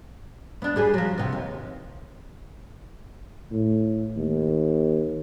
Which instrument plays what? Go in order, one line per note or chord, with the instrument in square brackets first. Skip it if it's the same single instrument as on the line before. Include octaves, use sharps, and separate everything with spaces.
[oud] B3 D4
G3 G#4 B4
F3 F#3
C3 B3
D#2
[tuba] A2
D#2